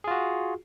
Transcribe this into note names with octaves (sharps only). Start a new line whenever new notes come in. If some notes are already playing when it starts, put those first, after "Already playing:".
F4 F#4 G#4